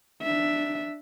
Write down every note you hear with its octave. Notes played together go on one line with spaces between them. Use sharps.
D4 E5